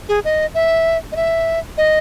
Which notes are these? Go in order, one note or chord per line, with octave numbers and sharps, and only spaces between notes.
G#4
D#5
E5
D#5
E5
D#5